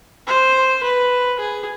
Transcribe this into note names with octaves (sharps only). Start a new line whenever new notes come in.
C5
B4
G#4